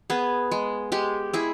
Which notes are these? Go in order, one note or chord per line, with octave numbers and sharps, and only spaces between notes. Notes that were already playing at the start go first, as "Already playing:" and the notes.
B3 G#4
G#3
G#3 G4
E4 G#4